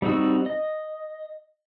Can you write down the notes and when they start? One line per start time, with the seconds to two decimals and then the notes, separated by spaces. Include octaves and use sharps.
0.02 G3 C4 D#4 F#4 E6
0.46 D#5